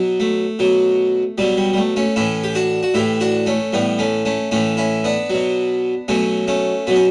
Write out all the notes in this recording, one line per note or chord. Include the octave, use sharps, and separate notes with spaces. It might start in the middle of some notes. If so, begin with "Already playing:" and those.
Already playing: B2 F#3
A3
B2 F#3
B2 F#3 G3
G3
G3
A3
A3 C#4
A2 E3 C#4 E4
G4
D4 F#4
F#4
A2 E3 E4 G4
D4 F#4
A3 C#4
A2 E3 G3 B3
A3 C#4
A3 C#4
A2 E3 A3 C#4
C#4 E4
B3 D4
B2 F#3
B2 F#3 A3 C#4
A3 C#4
B2 F#3 B3
C#4